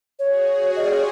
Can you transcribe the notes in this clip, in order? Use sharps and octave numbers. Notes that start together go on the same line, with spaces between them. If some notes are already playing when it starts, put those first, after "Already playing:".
F#4 G#4 C#5
F4 G4 D#5
D5
C#5